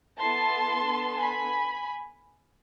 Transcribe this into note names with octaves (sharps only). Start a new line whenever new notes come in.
B3 E4 A4 A5 C6
B3 D4 A4
G#5 B5